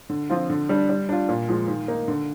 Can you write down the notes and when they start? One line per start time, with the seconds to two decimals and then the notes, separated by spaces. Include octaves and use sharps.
0.10 D3
0.30 F3 C4 F4
0.50 D3
0.69 G3 D4
0.89 G3
1.09 D4 F4
1.29 A#2
1.48 F3 G#3
1.68 D#3
1.88 A#3 D#4
2.08 D3